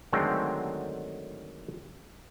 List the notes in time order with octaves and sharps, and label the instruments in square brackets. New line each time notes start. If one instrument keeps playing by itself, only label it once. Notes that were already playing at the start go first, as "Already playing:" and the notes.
[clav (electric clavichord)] D3 D#3 F#3 G#3 A3 C4